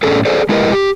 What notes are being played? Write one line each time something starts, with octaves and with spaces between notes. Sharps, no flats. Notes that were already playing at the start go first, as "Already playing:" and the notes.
A2 A3 C#4 D4 G#4 A4
G#4 A4 C5 D5
G#3 E4 G4 A#4 B4 D#5
G4